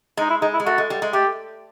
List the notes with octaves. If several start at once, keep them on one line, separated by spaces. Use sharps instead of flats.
G#3 D#4
E4
G#3 D#4
E4
G#3
A3 F#4
G#3
G3
G#3
A3 G4